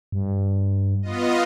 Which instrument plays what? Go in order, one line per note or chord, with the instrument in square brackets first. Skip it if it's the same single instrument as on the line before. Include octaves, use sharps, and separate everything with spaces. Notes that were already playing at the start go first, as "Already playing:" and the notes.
[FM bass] G2
[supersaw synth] B3 F4 D#5